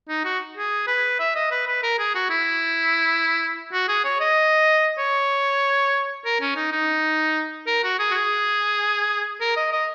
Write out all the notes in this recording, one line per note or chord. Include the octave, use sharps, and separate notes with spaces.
D#4
F#4
G#4
B4
E5
D#5
B4
B4
A#4
G#4
F#4
E4
F#4
G#4
C#5
D#5
C#5
A#4
C#4
D#4
D#4
A#4
F#4
G#4
F#4
G#4
A#4
D#5
D#5